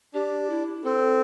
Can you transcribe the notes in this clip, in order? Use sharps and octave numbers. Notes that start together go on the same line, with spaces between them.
D4 G4
E4
C4 A4